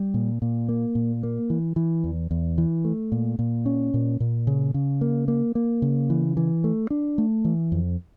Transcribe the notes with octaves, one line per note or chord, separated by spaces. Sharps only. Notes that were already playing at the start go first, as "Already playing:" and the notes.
Already playing: G3
A#2
A#2
A#3
A#2
A#3
E3
E3
E2
E2
E3
A3
A#2
A#2
C#4
A#2
A#2
C#3
C#3
A#3
A#3
A#3
C#3
E3
E3
A3
D4
A3
E3
F2